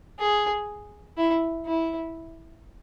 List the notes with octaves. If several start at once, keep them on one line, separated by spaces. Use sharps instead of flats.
G#4
E4
E4